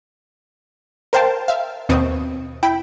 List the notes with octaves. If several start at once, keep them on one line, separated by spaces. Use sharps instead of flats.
A#4 C5 F5 G5 A5
E5 F5
D#2 B2 C4 C#6 D#6
E4 G5 B5